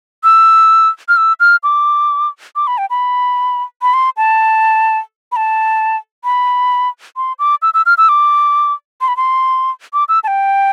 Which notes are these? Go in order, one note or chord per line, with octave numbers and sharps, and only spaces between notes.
E6
F6
E6
F6
D6
D6
B5
G5
B5
B5
C6
A5
B5
A5
B5
C6
D6
E6
E6
F6
E6
D6
C6
B5
C6
D6
E6
A5
G5